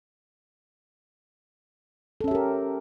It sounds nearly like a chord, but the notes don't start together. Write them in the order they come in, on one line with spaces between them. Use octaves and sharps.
A4 C#4 E5 G4 A#4